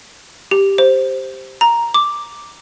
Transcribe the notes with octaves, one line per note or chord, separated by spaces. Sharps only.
G4
C5
A#5
D6